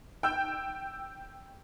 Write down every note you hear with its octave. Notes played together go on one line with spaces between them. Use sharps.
G5 E6 G6